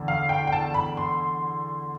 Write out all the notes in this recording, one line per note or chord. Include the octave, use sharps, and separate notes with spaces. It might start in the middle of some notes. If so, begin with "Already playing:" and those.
Already playing: E2 D3
F5
G5
G5
A5
B5
C6